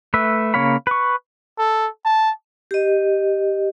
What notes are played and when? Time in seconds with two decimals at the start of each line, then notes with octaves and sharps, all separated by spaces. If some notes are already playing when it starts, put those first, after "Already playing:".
0.14 A3 B4 E5
0.54 C#3 A#3 C#5 F5 B5
0.87 B4 C#6
1.58 A4
2.05 A5
2.71 G4 D#5